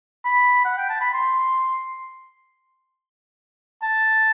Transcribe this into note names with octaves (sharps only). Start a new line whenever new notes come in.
B5
F#5
G5
A5
B5
C6
A5